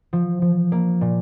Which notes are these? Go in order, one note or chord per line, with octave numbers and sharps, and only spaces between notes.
F3
F3
A#3
A#2